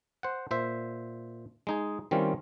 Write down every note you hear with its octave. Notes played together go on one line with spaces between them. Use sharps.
C5 F#5
A#2 C5 E5
G#3 D#4 G#4
D#3 G3 C4 C#4 E4 F4